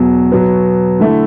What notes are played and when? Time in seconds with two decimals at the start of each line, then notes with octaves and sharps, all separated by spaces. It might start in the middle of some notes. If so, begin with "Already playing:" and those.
Already playing: E2 B2 F#3
0.32 B2 F#3 B3
1.00 D3 A3 E4